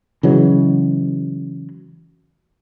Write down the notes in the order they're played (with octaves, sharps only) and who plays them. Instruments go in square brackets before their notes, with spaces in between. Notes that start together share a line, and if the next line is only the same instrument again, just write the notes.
[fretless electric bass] C#3 E3 F#3 G#3